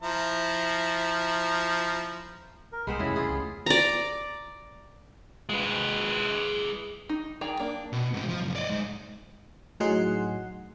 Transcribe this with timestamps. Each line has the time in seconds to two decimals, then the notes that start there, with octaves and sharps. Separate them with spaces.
0.02 F3 E4 A#5
2.72 A#4
2.87 C2 G#3 B3 C4 B5
2.99 C2 F2 C#3 E3 A3 E4
3.16 F4 G#4
3.30 C#2 G3 A3
3.66 D5 A#5
5.49 G#3 B4
7.09 D#4
7.41 D#3 G#4 D5 G5 A#5
7.59 A#3 D4
7.93 B2
8.14 G#2 C4
8.28 F3
8.42 C#2 F#2
8.56 D5 D#5
8.69 G#2 G#3
9.80 A2 F#3 D#4 G#4 F#5 C6